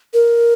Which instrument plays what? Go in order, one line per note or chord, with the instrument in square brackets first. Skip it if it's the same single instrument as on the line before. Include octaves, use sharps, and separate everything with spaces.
[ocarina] A#4